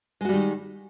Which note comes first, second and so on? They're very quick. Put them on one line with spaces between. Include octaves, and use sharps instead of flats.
G#3 F#4 G3 D#3